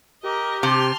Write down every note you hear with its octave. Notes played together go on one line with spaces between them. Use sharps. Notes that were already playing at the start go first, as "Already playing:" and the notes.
G4 A#4 D#5
C3 A5 C6 F6